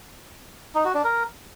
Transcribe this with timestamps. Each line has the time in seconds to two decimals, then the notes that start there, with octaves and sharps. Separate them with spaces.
0.75 D#4
0.85 F#4
0.95 D4
1.04 A#4